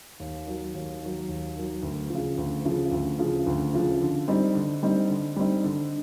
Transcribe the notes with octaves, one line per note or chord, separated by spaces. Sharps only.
D#2
D#3 F#3
D#2
D#3 F#3
D#2
D#3 F#3
D2
C#3 F3
D2
C#3 F3
D2
C#3 F3
D2
C#3 F3
D3
G3 C4 D#4
D3
G3 C4 D#4
D3
G3 C4 D#4
D3